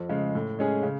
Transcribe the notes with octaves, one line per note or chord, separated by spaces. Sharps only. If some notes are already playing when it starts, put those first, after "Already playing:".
Already playing: F2
C#3 G#3
A2
G#3 C#4 G#4
C#3